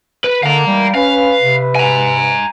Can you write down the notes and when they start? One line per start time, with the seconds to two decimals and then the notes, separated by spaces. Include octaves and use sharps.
0.24 B4
0.43 D3 D#3 A3 F5 A#5
0.66 D#3 E3 G3 G#3
0.95 C#4 B4 F5
1.41 C3
1.75 G#5 A#5